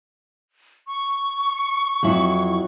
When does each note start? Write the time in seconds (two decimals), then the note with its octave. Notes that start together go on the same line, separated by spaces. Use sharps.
0.87 C#6
2.03 F2 F#3 E4